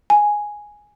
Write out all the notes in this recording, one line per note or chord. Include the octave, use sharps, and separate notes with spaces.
G#5